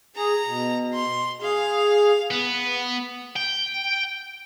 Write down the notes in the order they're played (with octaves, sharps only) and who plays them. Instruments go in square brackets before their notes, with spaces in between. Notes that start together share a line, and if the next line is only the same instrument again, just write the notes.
[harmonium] G#4 [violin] A#5
[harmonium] B2
[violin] C6
[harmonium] G#4 [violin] F5
[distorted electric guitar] B3
G5